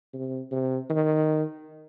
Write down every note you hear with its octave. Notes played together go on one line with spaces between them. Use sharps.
C3
C3
D#3